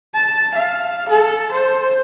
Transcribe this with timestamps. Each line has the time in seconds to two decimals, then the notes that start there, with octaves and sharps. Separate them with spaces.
0.14 A5
0.55 F5
1.09 A4
1.52 C5